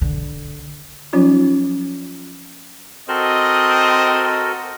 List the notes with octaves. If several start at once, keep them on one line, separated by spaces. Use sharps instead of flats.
D3
F3 F#3 C#4 D#4 F4
C4 F#4 A4 A#4 D#5